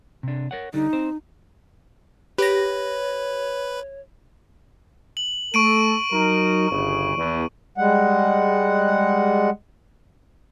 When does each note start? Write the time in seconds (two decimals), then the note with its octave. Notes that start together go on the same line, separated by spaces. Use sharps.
0.23 C3 D4
0.51 A#4 C#5 F#5
0.74 D3 G3 D#4
0.93 C4 C5
2.38 G4 B4 C#5 A#6
5.17 F#7
5.54 A3 A4 C#6 D7 D#7
6.12 F#3 D#4 A#4
6.71 G1 C#3
7.17 E2
7.78 G3 G#3 F#5